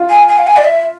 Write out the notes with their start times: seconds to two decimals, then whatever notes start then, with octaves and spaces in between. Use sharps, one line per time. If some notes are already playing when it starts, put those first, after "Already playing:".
Already playing: F4
0.10 G#5
0.28 G#5
0.38 F5
0.47 G#5
0.56 D5
0.65 E5